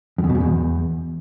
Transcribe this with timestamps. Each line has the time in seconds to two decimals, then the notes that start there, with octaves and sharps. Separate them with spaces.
0.18 F2
0.24 E2
0.29 B2
0.35 F#2
0.40 E2